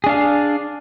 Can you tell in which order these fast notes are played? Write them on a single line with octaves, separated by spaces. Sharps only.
G#4 D4 F5